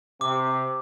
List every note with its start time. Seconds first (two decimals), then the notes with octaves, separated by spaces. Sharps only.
0.21 C3 D6